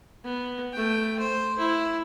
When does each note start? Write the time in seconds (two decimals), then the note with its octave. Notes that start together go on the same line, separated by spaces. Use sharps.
0.24 B3
0.72 A3 G5
1.19 C5
1.58 E4